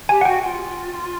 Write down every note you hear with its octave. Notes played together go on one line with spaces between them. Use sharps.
G4 G#5
F#5
F#4 G5
F4